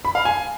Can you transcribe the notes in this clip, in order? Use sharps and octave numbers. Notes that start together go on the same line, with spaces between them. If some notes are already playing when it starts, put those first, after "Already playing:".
B5
F5
G#5